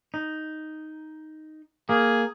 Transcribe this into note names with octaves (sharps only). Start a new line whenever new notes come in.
D#4
A#3 G#4